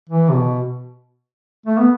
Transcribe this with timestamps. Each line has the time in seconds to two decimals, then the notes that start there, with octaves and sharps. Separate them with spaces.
0.09 E3
0.29 C3
0.34 B2
1.66 A3
1.78 B3